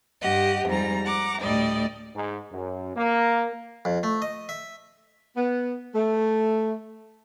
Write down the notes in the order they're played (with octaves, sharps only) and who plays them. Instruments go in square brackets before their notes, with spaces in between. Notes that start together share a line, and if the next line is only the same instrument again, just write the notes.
[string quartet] G2 G4 D#5 F#5
F2 G#2 G3 A#5
F#5 A#5 D6
D2 A2 G3 D5 D#5
[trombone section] G#2
F#2
A#3
[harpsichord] F2
A3
D#5
E5
[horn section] B3
A3